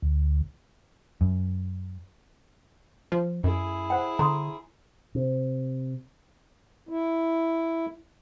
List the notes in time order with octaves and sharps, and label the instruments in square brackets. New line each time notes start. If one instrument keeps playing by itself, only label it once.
[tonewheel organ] D2
[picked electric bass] F#2
[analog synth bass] F3
[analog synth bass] F#2 [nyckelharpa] E4 G#4
[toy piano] C5 F#5 G5
[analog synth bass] D3 [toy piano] A#5 C6 D#6
[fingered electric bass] C3
[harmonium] E4